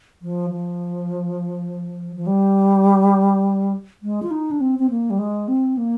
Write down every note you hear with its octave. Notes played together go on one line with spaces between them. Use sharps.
F3
F3
F3
G3
G#3
F4
D#4
D4
C4
C4
A#3
G3
G#3
C4
A#3